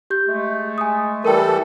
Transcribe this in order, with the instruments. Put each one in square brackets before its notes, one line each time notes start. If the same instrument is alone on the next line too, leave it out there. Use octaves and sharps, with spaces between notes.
[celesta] G4 G6
[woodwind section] G#3 A3
[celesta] G#5 D#6
[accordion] E3 G3 A4 [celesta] A#4 G5